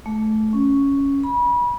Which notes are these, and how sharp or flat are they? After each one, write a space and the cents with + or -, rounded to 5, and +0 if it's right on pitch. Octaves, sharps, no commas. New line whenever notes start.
A3 -20
C#4 +0
B5 -30